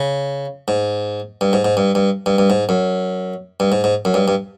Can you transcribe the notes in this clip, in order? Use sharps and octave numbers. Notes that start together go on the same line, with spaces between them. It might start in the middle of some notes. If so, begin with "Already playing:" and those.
Already playing: C#3
G#2
G2
G#2
G#2
G2
G2
G2
G2
G#2
F#2
G2
G#2
G#2
F#2
G2
G2